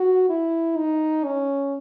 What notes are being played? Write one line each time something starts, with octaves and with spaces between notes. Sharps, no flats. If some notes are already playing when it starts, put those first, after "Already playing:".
Already playing: F#4
E4
D#4
C#4